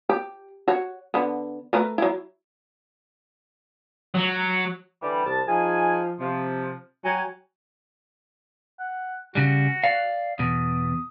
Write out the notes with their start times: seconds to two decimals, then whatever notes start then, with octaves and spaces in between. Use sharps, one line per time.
0.09 G4
0.68 F#4 C#5
1.14 D3 B3
1.73 A3 A#4 B4
1.98 F#3 E4
4.14 F#3
5.02 D3 E3 G3
5.26 C2 A5
5.48 F3 D#4 G#4 G#5
6.20 C3 F3
7.05 F#3 G5 G#5
8.80 F#5
9.35 C#3 G3 F#4
9.84 D5 F5
10.39 E2 B2 D#6